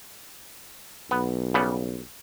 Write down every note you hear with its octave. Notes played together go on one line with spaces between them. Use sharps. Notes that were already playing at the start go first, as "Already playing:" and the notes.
B1 B3
C#3 G3 B3